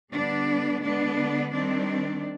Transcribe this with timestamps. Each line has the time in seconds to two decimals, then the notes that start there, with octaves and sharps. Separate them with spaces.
0.12 D3 G3 B3 D4
0.82 D3 G#3 B3 D4
1.52 D#3 G3 C4 D4